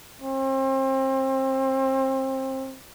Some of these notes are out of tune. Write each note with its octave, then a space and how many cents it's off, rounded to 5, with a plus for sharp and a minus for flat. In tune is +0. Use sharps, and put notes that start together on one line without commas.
C4 +30